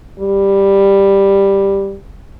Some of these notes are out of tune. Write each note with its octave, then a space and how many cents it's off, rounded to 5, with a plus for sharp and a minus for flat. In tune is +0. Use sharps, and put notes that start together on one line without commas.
G3 +5